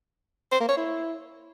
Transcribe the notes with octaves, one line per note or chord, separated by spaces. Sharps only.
C5
A#3
C#5
E4